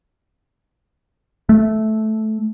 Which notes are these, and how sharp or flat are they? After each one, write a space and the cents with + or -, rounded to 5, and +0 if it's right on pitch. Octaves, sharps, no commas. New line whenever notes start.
A3 -10